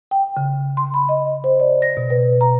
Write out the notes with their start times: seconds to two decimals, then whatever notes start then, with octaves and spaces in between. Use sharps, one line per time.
0.11 G5
0.37 C#3
0.77 C6
0.94 B5
1.09 D#5
1.44 C5
1.60 D5
1.82 A#6
1.97 B2
2.10 B4
2.41 A#5